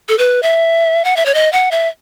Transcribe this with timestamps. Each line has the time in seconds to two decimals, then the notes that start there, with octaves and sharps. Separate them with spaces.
0.09 A4
0.18 B4
0.43 E5
1.05 F#5
1.17 E5
1.26 C#5
1.34 D#5
1.53 F#5
1.71 E5